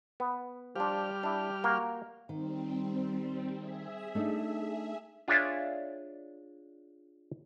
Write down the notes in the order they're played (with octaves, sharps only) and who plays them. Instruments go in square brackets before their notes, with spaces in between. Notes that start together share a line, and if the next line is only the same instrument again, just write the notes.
[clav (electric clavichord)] B3
[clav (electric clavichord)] F3 D4 [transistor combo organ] G3 G4 F6
[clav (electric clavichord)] D4 E4
A#3 F#4 A#4
[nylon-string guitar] D#3 [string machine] G3 C4
[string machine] G#4 E5
[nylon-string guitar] A3 D4 D#4
[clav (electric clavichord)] D4 F4 G#4 C#5 D5 E5